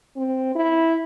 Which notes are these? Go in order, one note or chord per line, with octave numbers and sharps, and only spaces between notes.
C4
E4